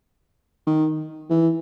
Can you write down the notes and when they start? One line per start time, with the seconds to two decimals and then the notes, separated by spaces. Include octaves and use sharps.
0.67 D#3
1.30 E3